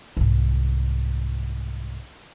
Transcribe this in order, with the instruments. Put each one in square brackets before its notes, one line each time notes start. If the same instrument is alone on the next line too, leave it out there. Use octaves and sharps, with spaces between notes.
[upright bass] C2 G#2